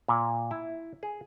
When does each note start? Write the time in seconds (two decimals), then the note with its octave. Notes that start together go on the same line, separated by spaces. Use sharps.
0.08 A#2
0.51 E4
1.03 G#4